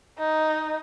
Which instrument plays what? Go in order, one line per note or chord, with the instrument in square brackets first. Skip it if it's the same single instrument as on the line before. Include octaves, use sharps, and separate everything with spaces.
[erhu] D#4